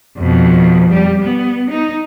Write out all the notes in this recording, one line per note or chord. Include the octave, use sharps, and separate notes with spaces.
F2 B2
G3 G4
B3
D#4